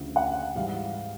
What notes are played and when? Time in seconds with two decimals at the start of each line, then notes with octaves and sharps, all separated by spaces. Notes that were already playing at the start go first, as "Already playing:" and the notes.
Already playing: D2 C#3 F3
0.16 F#5
0.55 G#2 E3 G3 F5